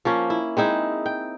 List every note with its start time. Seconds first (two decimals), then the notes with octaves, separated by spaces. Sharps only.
0.05 F3 A#3 C#4
0.30 E4
0.57 G#3 C4 D#4 E4
1.06 G5